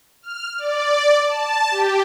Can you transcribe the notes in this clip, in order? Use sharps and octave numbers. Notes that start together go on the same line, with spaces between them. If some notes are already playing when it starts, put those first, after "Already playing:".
F6
D5
A5
G4